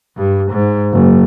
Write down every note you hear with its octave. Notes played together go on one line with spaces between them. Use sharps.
G2
G#2
F#1